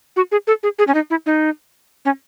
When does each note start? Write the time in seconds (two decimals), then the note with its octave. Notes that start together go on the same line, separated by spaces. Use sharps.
0.16 F#4
0.32 G#4
0.47 A4
0.63 G#4
0.79 G#4
0.88 C#4
0.94 D#4
1.10 E4
1.26 D#4
2.05 C#4